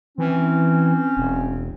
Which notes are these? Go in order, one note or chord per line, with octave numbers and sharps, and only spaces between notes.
E3 C4 C#4
E1